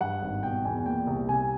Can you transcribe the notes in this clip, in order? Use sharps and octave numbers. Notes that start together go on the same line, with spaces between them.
G2 F#5
G#1
B2 G5
E2 G#5
A#2 G5
C2
C3 G#5